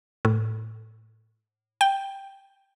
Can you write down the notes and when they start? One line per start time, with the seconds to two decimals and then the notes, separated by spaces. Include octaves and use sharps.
0.25 A2
1.81 G5